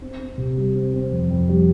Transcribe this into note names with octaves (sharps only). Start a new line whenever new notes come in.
C4
C4
C3
G3
C4
C4
F2
F2
G3